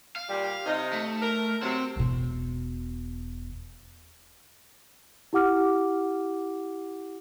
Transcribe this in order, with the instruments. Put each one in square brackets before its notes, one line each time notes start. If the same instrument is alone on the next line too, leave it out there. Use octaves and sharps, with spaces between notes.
[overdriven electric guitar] F5
[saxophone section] A#2 G3
C3 D#4
[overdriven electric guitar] A3
[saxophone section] A#4
[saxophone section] C3 F#3 [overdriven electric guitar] C4
[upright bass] E1 B2
[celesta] E4 G4 F#5 D6 F6